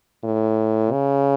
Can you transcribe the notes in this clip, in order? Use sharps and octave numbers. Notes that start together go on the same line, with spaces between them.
A2
C#3